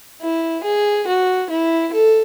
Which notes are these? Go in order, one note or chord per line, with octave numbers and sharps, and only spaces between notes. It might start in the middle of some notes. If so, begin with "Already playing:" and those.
E4
G#4
F#4
E4
A4